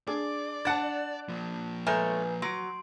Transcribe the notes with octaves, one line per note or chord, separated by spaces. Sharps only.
D4 G#4 D5 D6
D4 F#5 A5 F#6 A6
F3 A#3
G#3 A3 B4 C#5 G#5 A#5 F6 G6
F#3 C6 D7